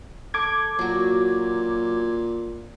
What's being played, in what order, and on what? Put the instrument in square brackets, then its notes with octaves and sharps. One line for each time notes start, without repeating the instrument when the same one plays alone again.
[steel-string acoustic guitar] A4 [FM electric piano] D6 G#6
[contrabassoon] A#2 [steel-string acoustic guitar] F#3 F#4